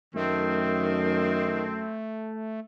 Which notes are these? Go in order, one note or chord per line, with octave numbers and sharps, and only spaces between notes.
F#2 D#3 A3 C4